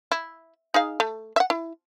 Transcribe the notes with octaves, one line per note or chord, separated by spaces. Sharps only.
E4
D#4 G#4 F5
A3
E5 F#5
E4